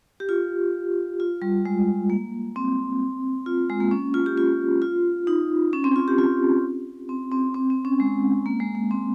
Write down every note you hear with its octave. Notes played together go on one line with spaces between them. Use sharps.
G4
F4
F4
G3
G#3
A#3
C4
F4
G#3
A#3
C#4
F4
G4
F4
F4
D#4
C#4
C4
F4
G4
F4
C4
C4
C4
C4
C#4
G#3
A#3
G#3
A#3
C4